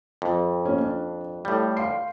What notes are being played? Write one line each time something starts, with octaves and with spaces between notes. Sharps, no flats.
F2
A#3 C#4
D4
A2 G3 G6
F5 C6 C7